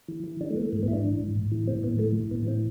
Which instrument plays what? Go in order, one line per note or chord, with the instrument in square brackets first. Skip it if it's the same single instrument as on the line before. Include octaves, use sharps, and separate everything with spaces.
[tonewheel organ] E3
E3
E3 D4
A3
E3 B3
A3
G#2 A3
B3
G#2 E4
D4
E3
G#2
A2
E3
E3 C4
A2 B3
E3 A3
E3
A2 B3
E3 C4